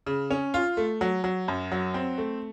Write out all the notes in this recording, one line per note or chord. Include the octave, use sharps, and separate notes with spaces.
C#3
C#4
F4
A3
F#3
F#3
F#2
F#3
C4
A3